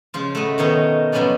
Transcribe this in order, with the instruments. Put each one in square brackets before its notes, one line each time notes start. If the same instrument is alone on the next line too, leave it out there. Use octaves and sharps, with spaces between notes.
[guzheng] C#3 F3 F4
A3 F#4 B4 D#5
B2 D#3 D#4 C#5
B2 F3 F#3 B3 C#4 D5